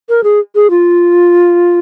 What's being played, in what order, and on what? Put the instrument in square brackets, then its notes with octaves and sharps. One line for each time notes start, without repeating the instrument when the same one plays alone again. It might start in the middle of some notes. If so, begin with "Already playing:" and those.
[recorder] A#4
G#4
G#4
F4